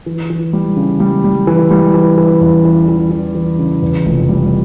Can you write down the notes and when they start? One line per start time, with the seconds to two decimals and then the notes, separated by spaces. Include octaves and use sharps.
0.06 E3
0.30 E3
0.53 G3
0.76 C#3
1.00 G3
1.24 G3
1.47 E3
1.71 G3
1.94 E3
2.18 E3
2.41 E2
2.65 E3
2.88 E3
3.11 E3
3.35 E3
3.59 C#3
3.82 E2
4.05 F1
4.29 G3